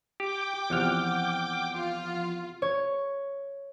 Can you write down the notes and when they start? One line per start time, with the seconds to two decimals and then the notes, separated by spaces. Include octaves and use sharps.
0.20 G4 G5 D6
0.70 E2 C3 F3 F#5 F6
1.75 F4
2.62 C#5